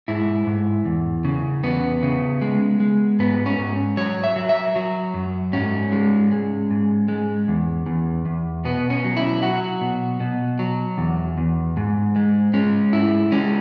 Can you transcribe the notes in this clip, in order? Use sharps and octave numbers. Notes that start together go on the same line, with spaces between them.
G#2 E4
G#2
E2
C#3
E2 B3
C#3
G#3
G#3
G#2 B3
C#4
G#2
F#3 C#5
E5
F#3
E5
F#3
F#2
G#2 C#4
G#3
G#3
G#2
G#3
E2
E2
E2
B2 B3
C#4
F#3
E4
F#3 F#4
B2
B2
F#3
E2
E2
G#2
G#3
G#3 C#4
G#2 E4
G#3 C#4